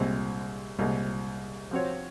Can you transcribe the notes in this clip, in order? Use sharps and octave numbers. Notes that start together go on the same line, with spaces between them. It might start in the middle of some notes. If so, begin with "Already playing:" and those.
Already playing: C2 A#2 G#3 C4
C2 A#2 G#3
F3 C4 F#4 C#5